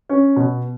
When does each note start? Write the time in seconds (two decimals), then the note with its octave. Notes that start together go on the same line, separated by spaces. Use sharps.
0.09 C#4
0.36 B2